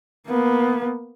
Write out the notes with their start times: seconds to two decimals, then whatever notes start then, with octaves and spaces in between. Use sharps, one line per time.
0.28 A#3 B3